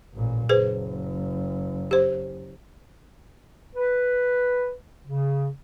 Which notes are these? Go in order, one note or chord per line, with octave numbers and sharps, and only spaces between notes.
A1 A#2
F#1 G#4 B4 C5
G4 C5
B4
C#3